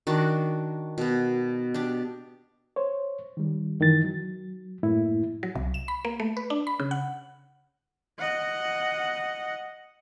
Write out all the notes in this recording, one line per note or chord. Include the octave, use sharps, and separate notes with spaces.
D#3 D4 F#4
B2 B3
D4 G4
C5 C#5
D#3 G3
F#2 D#3 E3 D#4 A6
F#3
F#2 A2 A#3 E4
F#3
C2
E7
B5
A#3
A3
B4
D4
B5
C#3
F#5
D#5 F#5